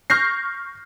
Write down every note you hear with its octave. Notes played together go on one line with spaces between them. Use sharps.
C#6 F6 G6 A#6 C7